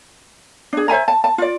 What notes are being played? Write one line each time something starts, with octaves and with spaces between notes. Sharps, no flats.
D4 G#4
C5 E5 G#5 A#5
A5
A5
F4 D5